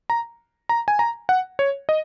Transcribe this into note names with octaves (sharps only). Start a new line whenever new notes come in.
A#5
A#5
G#5
A#5
F#5
C#5
D#5